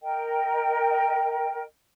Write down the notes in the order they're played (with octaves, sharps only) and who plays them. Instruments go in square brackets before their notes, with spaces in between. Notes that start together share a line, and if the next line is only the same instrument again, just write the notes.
[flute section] A#4 D#5 G5